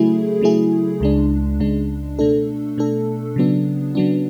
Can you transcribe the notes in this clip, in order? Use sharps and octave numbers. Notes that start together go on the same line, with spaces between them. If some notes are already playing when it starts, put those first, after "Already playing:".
Already playing: C#3 F#3 A3 E4 G#4
C#3 F#3 A3 E4 G#4
C#2 C#3 G#3 D4
C#2 C#3 G#3 D4
B2 A3 D4 A4
B2 A3 D4 A4
C#3 F#3 B3 D4
C#3 F#3 B3 D4